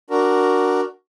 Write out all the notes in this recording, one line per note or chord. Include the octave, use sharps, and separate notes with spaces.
D4 F#4 A#4